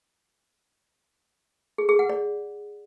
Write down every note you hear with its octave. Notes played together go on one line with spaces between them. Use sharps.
G#4
G#4
F#5
D5